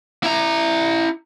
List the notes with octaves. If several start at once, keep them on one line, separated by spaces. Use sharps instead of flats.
E4 A#5